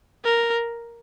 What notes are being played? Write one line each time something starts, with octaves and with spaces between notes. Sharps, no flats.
A#4